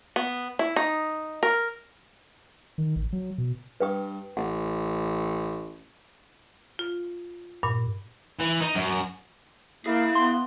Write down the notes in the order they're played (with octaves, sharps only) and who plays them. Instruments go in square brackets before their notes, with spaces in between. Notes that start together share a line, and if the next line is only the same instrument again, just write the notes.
[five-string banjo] B3
E4
D#4
A#4
[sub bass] D#3
A1
F#3
B2
[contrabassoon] G2 [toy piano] B4 G5 D#6
[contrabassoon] A1 [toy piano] F#5
[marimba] F4
G2 A#2
[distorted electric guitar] E3
D#4
F#2
[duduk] A#3 [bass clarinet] E4 [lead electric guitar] G#4 F5
[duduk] B3 [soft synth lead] C6